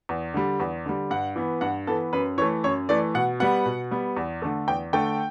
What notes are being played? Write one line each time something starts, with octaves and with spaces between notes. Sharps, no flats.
E2
D3 G3
E2
D3 G3
G2 F#5
E3 B3
G2 F#5
E3 B3 A4
F#2 B4
E3 A3 C#5
F#2 C#5
E3 A3 D5
B2 F#5
G3 B3 F#5
B2
G3 B3
E2
D3 A3
E2 G5
D3 A3 G5